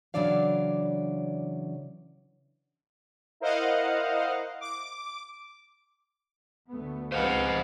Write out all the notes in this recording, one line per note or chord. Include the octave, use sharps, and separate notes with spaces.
C#3 E3 F#3 D4 D5 F5
E4 A#4 C5 D#5 F5 F#5
D6
D2 A3 B3
C#2 F3 C4 B4 C5 D#5 F5 F#5